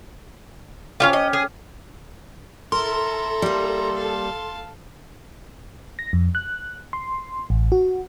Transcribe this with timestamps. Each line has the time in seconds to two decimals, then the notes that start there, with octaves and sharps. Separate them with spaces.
1.00 C#4 F4 G4 E5 F5
1.13 D#5
1.33 G#4
2.72 E4 A4 A#4 A#5 C6
3.42 G3 A#3
3.95 F5 A5
5.99 A#6
6.13 F2
6.35 F#6
6.93 C6
7.50 A1
7.72 F#4